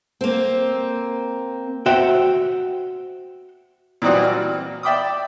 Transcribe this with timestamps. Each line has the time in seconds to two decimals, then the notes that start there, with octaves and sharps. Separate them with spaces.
0.21 A#3 C4
1.86 F#4 C5 E5 G5
4.02 A#2 E3 G3 C4 D#4 F#4
4.23 F6
4.83 D5 E5 G5 B5 D6 D#6